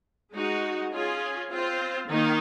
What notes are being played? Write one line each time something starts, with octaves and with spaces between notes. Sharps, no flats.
G#3 D#4 F#4
C#4 F4 G#4
C4 F4 C5
D#3 A#3 D#4